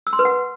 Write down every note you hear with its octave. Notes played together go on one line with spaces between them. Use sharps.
E6
C6
B4
F#5